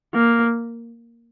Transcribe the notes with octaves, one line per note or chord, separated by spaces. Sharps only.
A#3